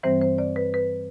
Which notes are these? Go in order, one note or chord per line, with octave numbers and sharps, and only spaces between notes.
G2 E3 G3 C4 C5
C5
D5
B4
B4